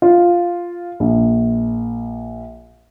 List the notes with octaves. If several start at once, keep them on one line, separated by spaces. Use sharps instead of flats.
F4
A#1